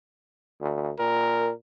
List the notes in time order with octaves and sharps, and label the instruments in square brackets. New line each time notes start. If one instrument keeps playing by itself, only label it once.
[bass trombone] D2
[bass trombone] A#2 [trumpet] A#4